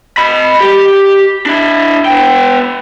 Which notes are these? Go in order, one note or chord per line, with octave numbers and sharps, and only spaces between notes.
D#5 B5
G4
D4 E4
B3 G5